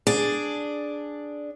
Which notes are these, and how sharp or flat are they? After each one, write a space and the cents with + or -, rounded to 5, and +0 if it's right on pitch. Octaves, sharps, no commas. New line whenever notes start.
D4 +0 G#4 +0 D5 +5